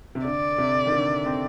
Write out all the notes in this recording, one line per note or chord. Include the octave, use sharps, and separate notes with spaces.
C3
D3 D5
C3
D#3
D3
C4